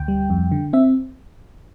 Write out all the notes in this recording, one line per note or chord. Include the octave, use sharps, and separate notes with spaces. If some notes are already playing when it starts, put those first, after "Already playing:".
Already playing: D2 G5
G3
F2
D3
C4 E5